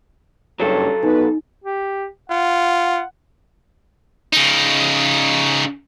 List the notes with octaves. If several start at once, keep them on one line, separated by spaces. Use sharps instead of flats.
F#1 G2 F#3 A4 C#5
B2 D#4 B4
G4
F4 F#5
C#3 D#4